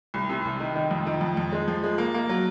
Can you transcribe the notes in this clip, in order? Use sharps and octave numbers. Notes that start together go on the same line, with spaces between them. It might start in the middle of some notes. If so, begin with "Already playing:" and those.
C2
C3
C2
D#3
D#3
F2
D#3
F2
F2
G#3
F3
G#3
A#3
A#3
F#3